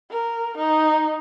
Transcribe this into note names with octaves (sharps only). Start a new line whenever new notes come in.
A#4
D#4